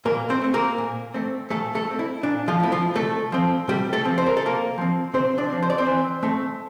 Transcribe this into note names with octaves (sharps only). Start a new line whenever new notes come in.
A#2 A#3 A#4
C4 C5
A3 C4
A#3 A#4
A#2
A3 C4
A#2 A3 A4
A3 A4
A3 C4
E4
A#2 D4
F3 F4
A3 C4 E4
F3 F4
C3 A3 A4
F3 C4
C3 G3 G4
A3 A4
F3 C4
C5
A#4
A4
C3 A#3 A#4
F3 C4
C3 C4 C5
D4 D5
F3 C4
C5
D5
C4 C5
E3
A3 C4